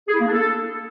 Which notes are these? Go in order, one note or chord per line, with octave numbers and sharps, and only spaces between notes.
G#4
E4
A#3
D4
A4